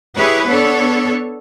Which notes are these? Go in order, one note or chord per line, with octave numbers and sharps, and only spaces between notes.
E4 G4 G#4 B4 C#5
B3 D4 A4 C#5